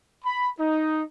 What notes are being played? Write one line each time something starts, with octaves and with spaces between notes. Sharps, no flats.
B5
D#4